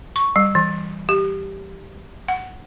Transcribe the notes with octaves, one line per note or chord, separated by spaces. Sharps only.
C#6
G3
E3
G4
F#5